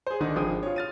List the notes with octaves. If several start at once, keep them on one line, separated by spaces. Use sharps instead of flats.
G#4 C5
D3 D#3 D4 D#4
G#1 F3 G#4 G5 D#6 D#7
F4 C#5
F6 A6 D#7